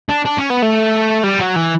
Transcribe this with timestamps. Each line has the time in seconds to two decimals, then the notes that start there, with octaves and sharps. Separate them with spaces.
0.09 D4
0.25 D4
0.38 C#4
0.50 B3
0.62 A3
1.23 G3
1.39 F#3
1.56 E3